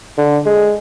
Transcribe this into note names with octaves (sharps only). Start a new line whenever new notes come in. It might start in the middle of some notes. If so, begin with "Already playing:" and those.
D3
G#3